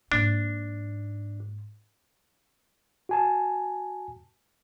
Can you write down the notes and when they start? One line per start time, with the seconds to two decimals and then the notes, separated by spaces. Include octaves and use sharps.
0.12 G#2 A#3 D4
3.09 F#4 G#5 A5